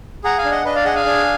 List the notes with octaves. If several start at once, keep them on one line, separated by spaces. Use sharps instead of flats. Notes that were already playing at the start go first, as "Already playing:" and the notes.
G#4 F#5 A#5
F5 G#5
D4
D#5 F#5
D4 B4 D#5
D5 F5
G#4 D#5 F#5
F5 G#5
D4